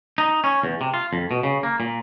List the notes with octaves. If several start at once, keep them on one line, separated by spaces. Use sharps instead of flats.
D#4
C#4
E2
C3
F4
F2
B2
C#3
A#3
A#2